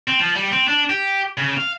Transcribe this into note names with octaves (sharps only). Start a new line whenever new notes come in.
C4
F3
G3
C4
D4
G4
C#3
F5